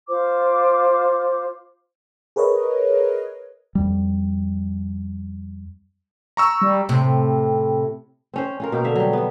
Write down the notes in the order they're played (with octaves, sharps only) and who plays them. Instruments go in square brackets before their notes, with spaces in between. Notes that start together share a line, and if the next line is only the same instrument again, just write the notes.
[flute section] F4 C5 D6
[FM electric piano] G#4 A#4 B4 C#5 D#5
[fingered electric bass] F2 G3
[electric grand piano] A#5 C#6 E6
[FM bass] G3
[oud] A2 C3
[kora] C4 C#4 C5
C#4 F4 A#4
B2 A#3 G5
D3 E5 F5
F#3 G3
G3 B3